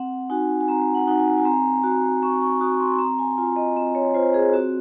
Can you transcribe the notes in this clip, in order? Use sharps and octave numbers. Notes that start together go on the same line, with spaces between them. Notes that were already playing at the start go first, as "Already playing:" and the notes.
Already playing: C4 F#5
D#4 F#4 G#5
G#5
C4 A#5
F#5
D#4 F#4 F#5
G#5
G#5
C4 A#5
F#4
C4 C#6
C#6
F#4 D#6
C#6
C6
C6
C4 A#5
G#5
F4 G#5
D#5
C4 D#5
C#5
F4 C5
G#4
C4 F#4